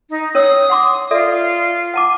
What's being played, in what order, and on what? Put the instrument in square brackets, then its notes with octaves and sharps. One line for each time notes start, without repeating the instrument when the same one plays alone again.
[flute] D#4
[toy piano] C#4 C#5 E6 [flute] D#6
[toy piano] F#5 C6 D6
[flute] F4 [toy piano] A4 D5 E5
[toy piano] F#5 A5 D6